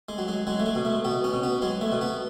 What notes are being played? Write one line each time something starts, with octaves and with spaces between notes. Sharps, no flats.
G#3
F#3
G#3
F#3 G#3
A3
G#3
B2
A3
B2 B3
C#4
B2
B3
F#3 G#3
A3
B2
B3